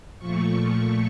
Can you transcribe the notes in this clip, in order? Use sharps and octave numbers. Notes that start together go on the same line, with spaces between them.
A#2 F3 A3 C#6
C#6